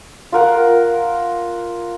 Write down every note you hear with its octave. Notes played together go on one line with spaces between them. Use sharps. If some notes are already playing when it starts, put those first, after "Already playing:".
F4 A#4 F#5